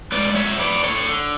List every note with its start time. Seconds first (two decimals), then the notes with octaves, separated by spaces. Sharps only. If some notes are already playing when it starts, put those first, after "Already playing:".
0.12 G#3 B4 D5
0.30 D5
0.35 F#3 C#5 E5
0.59 D3 B4 D5
0.83 D3 A4 C#5
1.07 D3